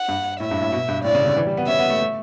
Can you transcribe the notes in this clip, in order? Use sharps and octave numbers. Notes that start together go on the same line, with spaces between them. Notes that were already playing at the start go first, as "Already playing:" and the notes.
Already playing: F#5
G2
A2 E5
G2
A2
B2
G2
A2 D5
C#3
D3
E3
G3
B3
C#4 E5
B3
A3
A3